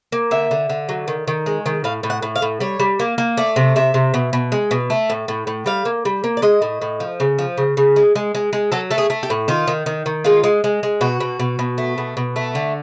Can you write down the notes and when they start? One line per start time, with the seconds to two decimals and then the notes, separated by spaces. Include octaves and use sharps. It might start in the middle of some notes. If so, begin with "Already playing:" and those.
0.12 A#3
0.31 D3 E5
0.51 D3
0.69 D3
0.89 F#3
1.08 D#3
1.27 D#3
1.46 G#3
1.66 D#3
1.84 A2 F5
2.03 A2
2.10 F#5
2.22 A2
2.36 F5
2.42 A2
2.60 G3 C#5
2.80 G3
2.99 A#3
3.18 A#3
3.37 A3 D5
3.56 C3
3.76 C3 E5
3.94 C3
4.14 B2
4.33 B2
4.52 G#3
4.71 B2
4.90 A3
5.10 A2
5.28 A2
5.47 A2
5.66 G3 F5
5.85 A#3
6.05 G3
6.24 A#3
6.37 D5
6.42 G#3 D#5
6.62 A2
6.81 A2
7.00 F3
7.20 C#3
7.38 F3
7.58 C#3
7.77 C#3
7.96 G#3
8.15 G#3
8.35 G#3
8.53 G#3
8.72 F#3 A4
8.90 A3 A4
8.98 G#4
9.10 A3
9.23 G4
9.30 A2
9.48 D#3 F4
9.67 D#3
9.86 D#3
10.06 D#3
10.24 G#3 F4
10.44 G#3
10.64 G#3
10.83 G#3
11.01 B2 F#4
11.20 B2
11.40 B2
11.59 B2
11.78 A3
11.98 B2
12.17 B2
12.36 A3
12.55 D3